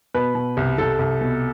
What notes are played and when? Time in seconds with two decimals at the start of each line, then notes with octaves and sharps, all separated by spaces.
0.14 B2 B4
0.35 B2
0.57 C2
0.78 C2 A4
0.99 C2
1.21 B2